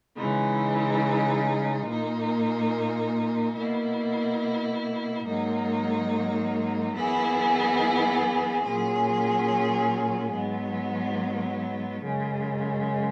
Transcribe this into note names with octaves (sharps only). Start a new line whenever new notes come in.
C#3 E3 G#3 D#4
A#2 A#3 D#4
B2 A#3 E4
G#2 F#3 A#3 D#4
F#2 E3 B3 E4 G#4
A#2 F#3 C#4 G#4
G#2 F#3 B3
F#2 C#3 G#3